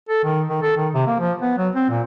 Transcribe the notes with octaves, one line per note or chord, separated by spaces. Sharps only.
A4
D#3
D#3
A4
D#3
C3
A#3
F3
B3
F#3
C4
A#2